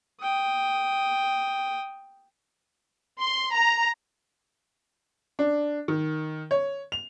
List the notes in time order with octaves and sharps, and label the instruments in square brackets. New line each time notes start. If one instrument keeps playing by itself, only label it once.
[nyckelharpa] G5 D#6
[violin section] C6
A#5
[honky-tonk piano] D4
D#3
C#5
F7